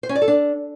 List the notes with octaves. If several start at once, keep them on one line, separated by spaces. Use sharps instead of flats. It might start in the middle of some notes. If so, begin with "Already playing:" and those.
C5
C#4
D5
A4
D4